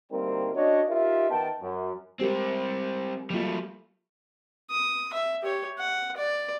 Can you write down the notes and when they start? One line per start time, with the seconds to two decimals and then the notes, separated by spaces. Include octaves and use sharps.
0.11 D2 G3 A#3 C4 D#4 A#4
0.55 C#4 D4 F#4 C#5 D#5
0.90 D#4 F4 G4 A#4 E5
1.30 D#3 B3 G5 A5
1.62 F#2
2.20 G3 G#3 C4 G4 A#4
3.30 F#3 G3 A3 A#3 F4
4.71 D#6
5.13 E5
5.42 G4 C#5
5.79 F#5
6.17 D5